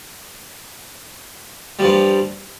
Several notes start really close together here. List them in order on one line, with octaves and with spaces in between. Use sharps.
G3 F3 G2